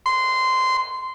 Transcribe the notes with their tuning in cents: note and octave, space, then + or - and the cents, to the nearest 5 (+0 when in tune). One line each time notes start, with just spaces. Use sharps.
C6 -15